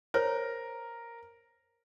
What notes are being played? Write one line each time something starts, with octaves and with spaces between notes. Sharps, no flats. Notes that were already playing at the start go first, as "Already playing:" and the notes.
A#4 C5 C#5